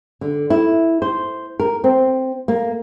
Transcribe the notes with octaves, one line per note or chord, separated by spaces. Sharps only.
D3
E4
C5
A#4
C4
A#3